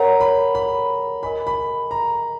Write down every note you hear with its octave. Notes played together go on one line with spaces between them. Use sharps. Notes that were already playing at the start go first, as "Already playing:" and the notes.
Already playing: A#4 C#5 F#5 A#5
B5
B5
A#4 D#5 G#5 B5
B5
A#5